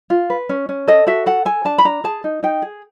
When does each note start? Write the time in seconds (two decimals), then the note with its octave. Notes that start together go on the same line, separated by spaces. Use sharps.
0.10 F4
0.30 B4
0.49 C#4
0.69 C#4
0.88 A4 D#5
1.07 F#4 E5
1.26 A4 F#5
1.45 A4 G#5
1.65 D4 A5
1.78 B5
1.85 D4 A#5
2.04 G#4 A5
2.24 D#4
2.43 D#4 G5
2.62 G#4